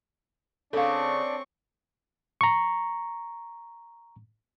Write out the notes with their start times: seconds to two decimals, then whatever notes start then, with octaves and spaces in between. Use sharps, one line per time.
0.73 C#3 C4 D4 A4 D5 F5 C#6
2.41 A#5 C#6